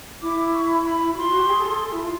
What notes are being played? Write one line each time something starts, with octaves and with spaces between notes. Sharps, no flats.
E4 D6
C#6
B5
B5
F#4
F4 C6
F#4
G4
G#4
A4
G#4
A4
E4
F4